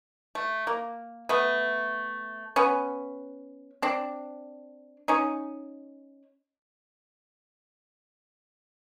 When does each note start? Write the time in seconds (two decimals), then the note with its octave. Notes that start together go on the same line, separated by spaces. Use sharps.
0.35 A3
0.67 A#3
1.29 A3 B3
2.56 B3 C#4
3.82 C4 D4
5.08 C#4 D#4